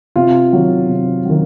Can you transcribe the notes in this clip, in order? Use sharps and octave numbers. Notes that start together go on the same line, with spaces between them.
C3 F4
D#3 F#3
C3
D#3 F#3